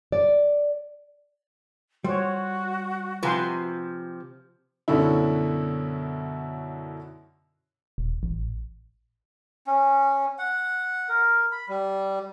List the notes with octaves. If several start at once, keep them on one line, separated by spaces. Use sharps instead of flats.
D5
G3 F#4 C5 C#5
C3 F3 B4 G#5 C6
F#2 B2 D3 C#4 E4
D#1
A1
C#4
F#5
A#4
B5
G3